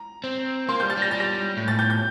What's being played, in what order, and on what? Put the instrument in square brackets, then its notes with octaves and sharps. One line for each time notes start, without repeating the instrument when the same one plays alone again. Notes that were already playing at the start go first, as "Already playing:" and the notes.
Already playing: [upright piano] A#5
[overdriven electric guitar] C4
[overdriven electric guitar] A#3 [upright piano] C6
[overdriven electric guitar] G3 [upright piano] G6
[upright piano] A6
[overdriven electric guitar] G3 [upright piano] A#6
[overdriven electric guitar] G3 [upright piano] A6
[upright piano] A#6
[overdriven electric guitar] A2
[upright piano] A6
G6
G6